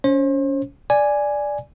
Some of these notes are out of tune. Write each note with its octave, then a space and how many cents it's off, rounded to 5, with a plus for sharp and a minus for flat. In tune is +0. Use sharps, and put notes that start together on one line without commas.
C#4 +25 C5 +40
D5 +0 G#5 +0